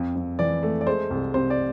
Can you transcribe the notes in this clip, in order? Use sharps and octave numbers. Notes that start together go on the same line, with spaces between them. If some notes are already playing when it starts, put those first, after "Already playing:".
Already playing: F2
F2
E3 D5
A3
D5
G#3 C5
C2
C3 C5
D5